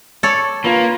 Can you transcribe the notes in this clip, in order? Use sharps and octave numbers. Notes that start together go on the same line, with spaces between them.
A4 C#5 D5
A#3 F4 B4